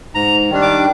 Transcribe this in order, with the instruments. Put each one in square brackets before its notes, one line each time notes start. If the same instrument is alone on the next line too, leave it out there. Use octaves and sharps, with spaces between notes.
[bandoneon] G#2 A#5
D#3 G3 D4
D6